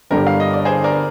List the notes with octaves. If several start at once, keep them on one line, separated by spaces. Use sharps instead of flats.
G1 G2 D3 G4 A#4
F5
D#5
D5
G#4 C5
A#4 D5